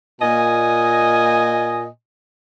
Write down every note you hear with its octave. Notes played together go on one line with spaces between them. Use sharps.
A#2 D#5 G#5